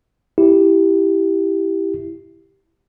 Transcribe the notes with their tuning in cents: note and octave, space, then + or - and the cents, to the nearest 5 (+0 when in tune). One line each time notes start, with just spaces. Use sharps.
E4 +0 G4 +0